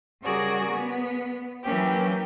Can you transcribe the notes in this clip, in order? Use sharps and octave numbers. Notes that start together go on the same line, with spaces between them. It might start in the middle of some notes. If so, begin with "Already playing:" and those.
C#3 G3 F#4 G#4 A#4 D5
B3
E3 F#3 A#3 C#4 G4